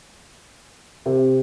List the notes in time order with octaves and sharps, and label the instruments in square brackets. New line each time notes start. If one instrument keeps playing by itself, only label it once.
[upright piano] C3